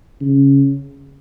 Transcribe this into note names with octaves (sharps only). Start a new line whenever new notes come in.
C#3